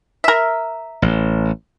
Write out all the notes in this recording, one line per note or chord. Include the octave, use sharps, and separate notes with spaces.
A#4 E5
A1